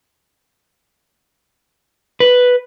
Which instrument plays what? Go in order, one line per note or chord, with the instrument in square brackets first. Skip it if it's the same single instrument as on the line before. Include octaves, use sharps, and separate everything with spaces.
[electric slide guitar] B4